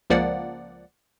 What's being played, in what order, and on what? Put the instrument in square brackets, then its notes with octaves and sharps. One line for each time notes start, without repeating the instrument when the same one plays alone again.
[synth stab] C#2 F3 A#3 D5 F#5